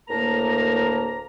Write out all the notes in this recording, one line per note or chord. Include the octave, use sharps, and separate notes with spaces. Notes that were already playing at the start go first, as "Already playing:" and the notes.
D2 A2 A#3 A#4 A5 A#5